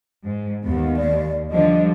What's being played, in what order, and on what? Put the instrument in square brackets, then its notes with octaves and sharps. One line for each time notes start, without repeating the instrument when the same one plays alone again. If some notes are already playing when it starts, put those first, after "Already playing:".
[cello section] G#2
[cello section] D#2 [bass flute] B3
[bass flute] D5
[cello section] D3 F3 G3 [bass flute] D#5